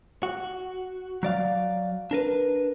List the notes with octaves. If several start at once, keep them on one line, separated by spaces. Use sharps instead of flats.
F#4
F#3 D5 F5
D4 A#4 B4